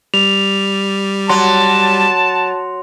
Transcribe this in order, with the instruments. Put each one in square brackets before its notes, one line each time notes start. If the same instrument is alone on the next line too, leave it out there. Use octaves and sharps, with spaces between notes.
[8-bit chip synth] G3 [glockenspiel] F7
[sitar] F#3 [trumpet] A5 [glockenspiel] C6